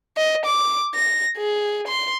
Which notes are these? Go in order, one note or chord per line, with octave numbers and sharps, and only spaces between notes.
D#5
D6
A#6
G#4
C6